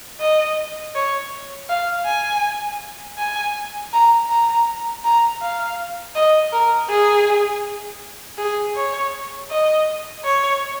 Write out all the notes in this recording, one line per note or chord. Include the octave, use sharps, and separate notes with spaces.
D#5
C#5
F5
G#5
G#5
A#5
A#5
A#5
F5
D#5
A#4
G#4
G#4
C#5
D#5
C#5